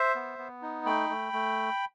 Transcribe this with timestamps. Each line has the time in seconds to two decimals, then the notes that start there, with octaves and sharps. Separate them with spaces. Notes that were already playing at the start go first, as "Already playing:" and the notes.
Already playing: C5 E5
0.16 B3
0.38 B3
0.62 D#4
0.85 A3 G5 B5
1.10 A3
1.33 A3